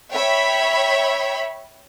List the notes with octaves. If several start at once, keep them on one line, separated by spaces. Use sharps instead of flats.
C#5 E5 G5 B5